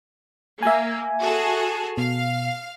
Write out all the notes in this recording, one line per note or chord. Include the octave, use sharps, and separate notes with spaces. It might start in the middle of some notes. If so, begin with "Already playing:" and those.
A#3 E5 G#5
F#4 G#4 A4
B2 F5